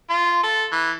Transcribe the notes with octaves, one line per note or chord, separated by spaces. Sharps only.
F4
A4
E3